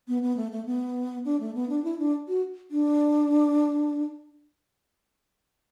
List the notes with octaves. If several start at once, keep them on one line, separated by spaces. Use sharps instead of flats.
B3
B3
A3
A3
B3
D4
A3
B3
D4
E4
D4
F#4
D4